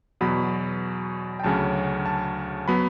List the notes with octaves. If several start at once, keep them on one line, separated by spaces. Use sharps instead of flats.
E2 B2 F#3 B5
G5
D2 C#3 F#3 C#4 A5
A5
F#3 B3 B5